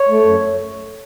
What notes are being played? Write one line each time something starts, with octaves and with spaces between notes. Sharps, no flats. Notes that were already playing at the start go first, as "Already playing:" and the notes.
Already playing: C#5
A3
F#2